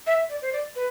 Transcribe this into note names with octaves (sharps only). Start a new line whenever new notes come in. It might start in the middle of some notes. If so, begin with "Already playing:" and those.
E5
D5
C5
D5
B4